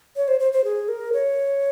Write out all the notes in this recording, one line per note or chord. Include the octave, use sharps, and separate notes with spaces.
C#5
C5
C5
C5
G#4
A#4
C#5